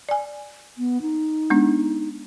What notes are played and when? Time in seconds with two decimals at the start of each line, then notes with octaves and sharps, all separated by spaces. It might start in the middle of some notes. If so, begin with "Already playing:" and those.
0.09 D5 G#5
0.78 B3
1.02 D#4
1.50 G#3 B3 D4